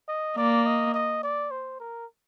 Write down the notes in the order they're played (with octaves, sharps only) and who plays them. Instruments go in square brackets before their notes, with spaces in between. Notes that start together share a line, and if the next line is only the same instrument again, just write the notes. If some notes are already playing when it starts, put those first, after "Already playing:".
[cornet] D#5
[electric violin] A#3 [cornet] D5
[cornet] D#5
D#5
D5
C5
A#4